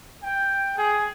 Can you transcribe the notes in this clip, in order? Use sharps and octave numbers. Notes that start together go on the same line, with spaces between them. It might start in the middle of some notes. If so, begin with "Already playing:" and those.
G5
G#4